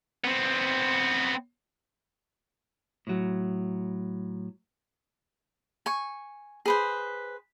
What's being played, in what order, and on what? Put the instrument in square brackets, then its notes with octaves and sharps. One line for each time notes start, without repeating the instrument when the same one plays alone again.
[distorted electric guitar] B3 C4
[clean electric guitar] A2 F#3
[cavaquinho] G#5 C#6
G#4 B4 C5